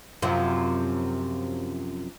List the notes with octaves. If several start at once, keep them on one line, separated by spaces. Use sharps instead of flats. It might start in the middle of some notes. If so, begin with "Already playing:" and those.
F#2 C3 F3